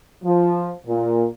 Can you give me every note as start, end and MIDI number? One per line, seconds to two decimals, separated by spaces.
0.23 0.71 53
0.86 1.26 46